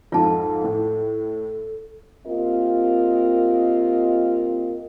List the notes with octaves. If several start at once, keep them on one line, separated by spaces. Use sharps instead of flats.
F2 G#2 F3 F4 A4 A5
A2
A#3 C4 F4 G4 A#4 D#5